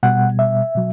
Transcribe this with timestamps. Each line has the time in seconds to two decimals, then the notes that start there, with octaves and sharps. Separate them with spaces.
0.03 B2 G3 F#5
0.39 E5
0.75 B2 F#3